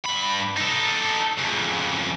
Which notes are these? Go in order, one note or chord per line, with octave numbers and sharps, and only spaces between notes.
G2 B5
D#4 A4
F2 C#3